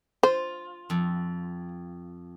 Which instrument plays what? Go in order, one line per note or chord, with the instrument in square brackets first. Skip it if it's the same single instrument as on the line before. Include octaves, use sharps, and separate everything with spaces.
[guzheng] F4 [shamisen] C5
[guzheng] F2